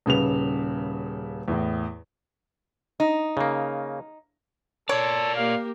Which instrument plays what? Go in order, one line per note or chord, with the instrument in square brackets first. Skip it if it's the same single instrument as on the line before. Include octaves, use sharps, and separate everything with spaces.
[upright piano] D#1 C#3 B4 F7
E2 A2
[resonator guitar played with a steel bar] D#4
[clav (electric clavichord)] C#3 A#3
[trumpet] A4 [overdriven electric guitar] A#4 D5 [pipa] C#5
[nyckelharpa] A#3 G4 [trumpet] F5